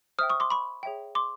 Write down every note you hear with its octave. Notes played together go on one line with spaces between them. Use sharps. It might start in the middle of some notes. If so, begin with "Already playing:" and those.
C5 E5 G5 D#6 F6
C#6 D#6
C6 D6
B5 C#6
G#4 C#5 E5 G5
C6 D6